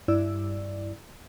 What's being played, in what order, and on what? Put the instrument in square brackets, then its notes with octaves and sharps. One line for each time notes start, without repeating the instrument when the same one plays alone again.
[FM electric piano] G2 E4 D5 E6